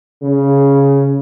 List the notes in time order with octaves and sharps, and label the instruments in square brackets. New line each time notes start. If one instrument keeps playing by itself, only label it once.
[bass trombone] C#3